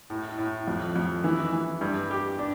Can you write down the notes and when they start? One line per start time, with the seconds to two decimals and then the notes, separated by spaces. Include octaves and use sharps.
0.10 A2
0.38 A2
0.67 F2
0.96 F2
1.24 E3
1.53 E3
1.81 G2
2.11 G4
2.39 D4